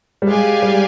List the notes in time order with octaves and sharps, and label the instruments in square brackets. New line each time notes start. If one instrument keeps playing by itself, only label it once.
[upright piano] G3
[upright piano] G#3 [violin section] G4 D5 F5 G#5
[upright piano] G3